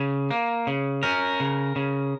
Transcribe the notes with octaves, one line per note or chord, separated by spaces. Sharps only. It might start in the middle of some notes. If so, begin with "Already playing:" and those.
Already playing: C#3
A#3
C#3
C#4 A#4
C#3
C#3